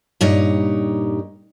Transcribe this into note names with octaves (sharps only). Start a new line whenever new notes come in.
G2 A#2 D#4 G4 C#5